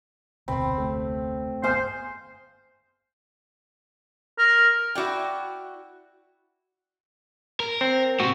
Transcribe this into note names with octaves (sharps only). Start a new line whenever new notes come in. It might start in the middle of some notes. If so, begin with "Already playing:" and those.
F1 D2 B2 C4 B5 C6
A3
G1 B3 G#4 C5 F5
A#4
E4 F#4 D5 G5
A#4
C4
A2 C3 F#4